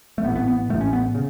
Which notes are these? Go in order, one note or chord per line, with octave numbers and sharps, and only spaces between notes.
A3
A1 A2 B3
B3
B3
A1 A2 A3
C#4
B3
C#3